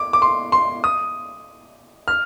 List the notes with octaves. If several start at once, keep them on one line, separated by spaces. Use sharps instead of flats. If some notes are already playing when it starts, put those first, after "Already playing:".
Already playing: D6
D6
C6
C6
D#6
F6